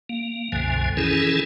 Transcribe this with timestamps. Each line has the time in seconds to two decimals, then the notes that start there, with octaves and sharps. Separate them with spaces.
0.09 A#3
0.52 C2 F#2 B2 D3 F3 G#5
0.97 D#3 E3 C#4 E4 G#4 A4